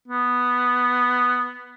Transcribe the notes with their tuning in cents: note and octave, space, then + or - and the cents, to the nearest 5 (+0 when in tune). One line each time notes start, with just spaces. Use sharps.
B3 +0